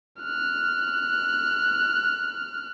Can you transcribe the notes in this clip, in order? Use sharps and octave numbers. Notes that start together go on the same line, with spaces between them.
F6 F#6